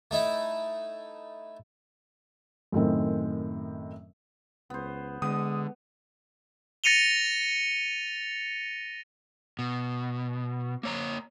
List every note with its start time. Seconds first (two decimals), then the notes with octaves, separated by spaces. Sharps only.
0.11 A3 D#4 E4
2.72 F#2 A2 D#3 C4
4.70 C#2 B3 C5
5.22 D3 G#3 B3 D#6
6.84 A6 A#6 C#7 D#7 F7 G7
9.59 B2
10.83 A#3 C#5 A#5